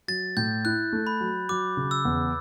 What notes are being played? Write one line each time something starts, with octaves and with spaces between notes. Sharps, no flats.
F#3 A6
A2 G6
E4 F#6
A3
B5
F#3
F#3 D6
C#3
E6
E2